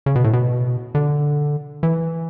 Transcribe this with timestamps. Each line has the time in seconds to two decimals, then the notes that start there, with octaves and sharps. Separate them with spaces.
0.06 C#3
0.15 B2
0.24 A2
0.33 B2
0.95 D3
1.83 E3